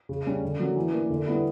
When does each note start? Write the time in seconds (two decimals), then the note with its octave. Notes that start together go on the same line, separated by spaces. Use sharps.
0.09 C#3
0.26 G3 C#4
0.43 D3
0.60 F#3 A#3 C#4
0.76 E3
0.93 A#3 D4
1.10 D3
1.26 G3 B3 E4